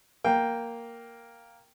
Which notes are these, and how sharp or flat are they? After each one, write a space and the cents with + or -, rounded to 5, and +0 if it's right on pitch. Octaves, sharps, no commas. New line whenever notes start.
A#3 +0 G5 +0